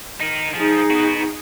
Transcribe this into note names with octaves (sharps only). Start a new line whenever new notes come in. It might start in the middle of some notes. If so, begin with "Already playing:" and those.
D#4 A#4
F3 D#4 G#4
B3 F#4